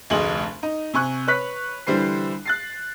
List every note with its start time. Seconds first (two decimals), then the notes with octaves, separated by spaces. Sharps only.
0.10 F1 D2 G#4 D#5 F#7
0.63 D#4
0.94 C3 G#5 C#6 F#6
1.28 B4 C#5 F#6 B6
1.87 D3 E3 G3 C5 C7
2.46 F#6 A6 C7